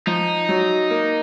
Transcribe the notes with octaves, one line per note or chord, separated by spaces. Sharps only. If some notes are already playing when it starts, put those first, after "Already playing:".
F3 D#4
F#3
A#3